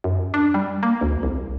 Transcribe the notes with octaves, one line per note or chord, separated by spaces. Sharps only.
F#2
D4
G3
A#3
D2
C2